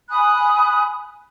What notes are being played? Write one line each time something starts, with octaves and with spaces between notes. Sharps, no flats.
G#5 B5 D#6 F#6